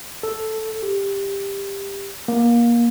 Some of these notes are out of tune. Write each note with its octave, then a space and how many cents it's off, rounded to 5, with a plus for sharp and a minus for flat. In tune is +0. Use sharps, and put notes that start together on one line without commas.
A4 +0
G4 +15
A#3 +20